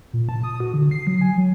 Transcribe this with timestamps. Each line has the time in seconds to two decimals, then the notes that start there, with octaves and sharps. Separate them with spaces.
0.13 A#2
0.29 A5
0.43 D#6
0.60 F#4
0.74 D3
0.91 C7
1.07 F#3
1.21 G#5
1.37 F#3